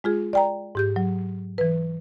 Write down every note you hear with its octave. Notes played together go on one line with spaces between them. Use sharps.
G#3 F4 G#4
D5 G5 A#5
G#2 G4 G6
F#3
E3 B4